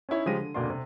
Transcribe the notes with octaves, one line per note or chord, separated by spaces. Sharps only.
C#4 D#4 E4 C#5
C#3 F3 G#3 G4 A#6 D#7
D3
F1 D2 B2 A#3 D5 C6
C3